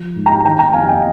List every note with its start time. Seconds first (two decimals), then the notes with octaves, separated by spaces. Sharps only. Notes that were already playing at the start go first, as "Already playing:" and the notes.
Already playing: F3
0.16 G#2
0.26 G5 A#5
0.45 D#3 G5 A#5
0.59 G5 A#5
0.73 F2 F5 G#5
0.87 D#5 G5